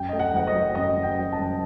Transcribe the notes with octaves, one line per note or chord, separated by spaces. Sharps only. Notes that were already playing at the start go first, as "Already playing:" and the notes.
Already playing: F#2 G5
A3 D#5
F#5
F#1 F#5
D#5
F#3
F#2 D#5
F#1
G5
F#3
A5
F#1